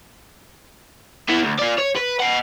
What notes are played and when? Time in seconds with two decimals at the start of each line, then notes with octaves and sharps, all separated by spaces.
1.29 B3 E4
1.42 D2
1.59 F4 D5
1.78 C#5
1.96 B4
2.20 D#5 F#5